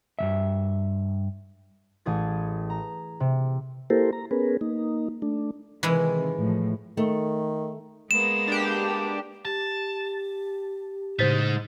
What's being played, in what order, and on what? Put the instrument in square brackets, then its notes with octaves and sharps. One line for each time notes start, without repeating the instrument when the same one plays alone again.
[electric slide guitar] G2 E3 E5
[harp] A1 G#4 A6
A#5
C3
[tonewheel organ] A#3 E4 G4 A4 A#4 C5
A#5
B3 C#4 G#4 A#4 B4
A#3 D#4
A3 D4
[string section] C3 D#3 [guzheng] E3 G#3 E4
[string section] A2 F3
[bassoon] D#3 [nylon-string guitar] A3
[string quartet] G#3 A#3 B3 [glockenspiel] E7
[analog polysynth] D4 G4
[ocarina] G4 [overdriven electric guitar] A5
[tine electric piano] A2 C#3 [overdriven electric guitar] G#3 D#4 [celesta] C5 A6 B6